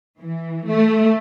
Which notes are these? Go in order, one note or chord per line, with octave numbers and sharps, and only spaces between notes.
E3
A3